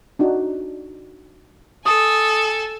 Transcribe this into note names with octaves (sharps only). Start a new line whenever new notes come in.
D4 D#4 F#4
A4 G#5 D#6